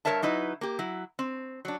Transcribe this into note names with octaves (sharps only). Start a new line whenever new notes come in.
G2 B3 A#4 C#5 E5 A5
F#3 D#4 E4 B4
A#3 G4
F#3 E4
C4
F#3 D4